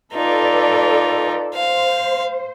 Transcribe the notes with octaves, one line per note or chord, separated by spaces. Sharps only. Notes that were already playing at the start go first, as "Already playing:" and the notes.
D#4 F4 A4 B4 D5
C5 F5